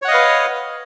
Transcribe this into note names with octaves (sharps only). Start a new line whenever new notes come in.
B4 C#5 D#5 F5 F#5